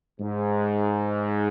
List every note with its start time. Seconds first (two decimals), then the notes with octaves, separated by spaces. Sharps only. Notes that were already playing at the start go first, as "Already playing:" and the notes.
0.20 G#2